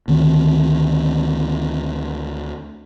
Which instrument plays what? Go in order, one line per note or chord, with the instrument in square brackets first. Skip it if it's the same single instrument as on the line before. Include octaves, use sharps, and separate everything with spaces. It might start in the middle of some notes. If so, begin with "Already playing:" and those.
[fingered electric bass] D2 D#3 C4